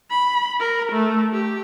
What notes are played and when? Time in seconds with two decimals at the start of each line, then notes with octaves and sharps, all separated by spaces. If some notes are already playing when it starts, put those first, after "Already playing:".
0.10 B5
0.60 A#4
0.91 A3
1.32 G4